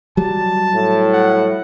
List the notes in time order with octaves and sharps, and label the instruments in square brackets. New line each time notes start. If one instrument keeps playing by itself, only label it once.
[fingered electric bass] F#3 G3 [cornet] A5
[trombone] A2
[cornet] F#5